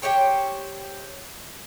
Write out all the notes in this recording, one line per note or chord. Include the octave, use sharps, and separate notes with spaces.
G4 C5 C#5 G5